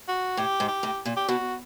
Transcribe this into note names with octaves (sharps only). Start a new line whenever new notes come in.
F#4
A2 G4
G#2
G4
A2
A#2
G4
B2 F#4